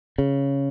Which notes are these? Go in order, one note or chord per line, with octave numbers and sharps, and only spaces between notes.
C#3